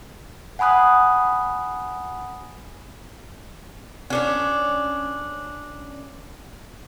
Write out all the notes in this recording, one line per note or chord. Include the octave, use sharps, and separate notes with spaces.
F#5 G#5 B5 D#6 F#6
C#4 D4 C#5